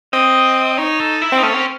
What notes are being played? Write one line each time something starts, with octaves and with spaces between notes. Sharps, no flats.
C4 D#5
D#4 C#5
A4
E4
C4
D#4
A3 C#4
C4